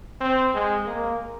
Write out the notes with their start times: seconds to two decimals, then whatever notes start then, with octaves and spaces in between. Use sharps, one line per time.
0.21 C4
0.54 G#3
0.87 A#3